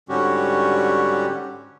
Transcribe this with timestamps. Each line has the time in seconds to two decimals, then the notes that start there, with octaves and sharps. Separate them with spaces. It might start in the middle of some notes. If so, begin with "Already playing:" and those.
0.09 G#2 D3 G3 C#4 F#4 G4